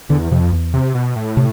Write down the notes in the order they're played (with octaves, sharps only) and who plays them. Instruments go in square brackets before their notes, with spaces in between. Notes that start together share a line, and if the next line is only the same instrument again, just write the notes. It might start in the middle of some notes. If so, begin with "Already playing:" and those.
[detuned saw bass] E2 [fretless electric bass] D3
[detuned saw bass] F2 [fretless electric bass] C3
[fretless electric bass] E2
[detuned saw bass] C3
B2
A2
[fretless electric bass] C3